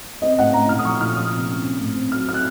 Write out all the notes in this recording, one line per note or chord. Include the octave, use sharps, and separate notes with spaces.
C4 D#5
A2 F#5
A2 A#5
A#2 F6
D#6
F3 C#6
A#2 F6
F3 D#6
C3
C#4
C4
A2
C4
F#3 F6
C4 F6
F#6